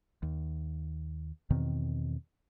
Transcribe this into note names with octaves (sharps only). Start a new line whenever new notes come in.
D#2
E2 B2 D#3 C4